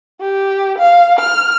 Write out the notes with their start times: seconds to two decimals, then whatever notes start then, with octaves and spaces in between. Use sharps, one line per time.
0.21 G4
0.78 F5
1.19 F6